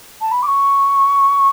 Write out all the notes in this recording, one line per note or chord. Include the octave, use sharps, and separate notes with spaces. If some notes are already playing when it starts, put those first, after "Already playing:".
A5
B5
D6
C#6